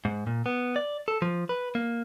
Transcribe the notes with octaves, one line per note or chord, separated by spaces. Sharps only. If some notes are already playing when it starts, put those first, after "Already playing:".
G#2
A#2
B3
D5
A4
F3
B4
A#3